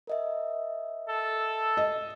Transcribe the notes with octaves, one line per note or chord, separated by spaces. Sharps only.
A#4 D#5 E5
A4
D#5